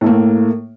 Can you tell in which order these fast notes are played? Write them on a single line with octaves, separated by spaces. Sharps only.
A2 A3 A#3